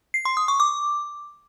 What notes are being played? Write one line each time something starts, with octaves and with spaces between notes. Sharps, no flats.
C7
C6
D#6
C#6
D6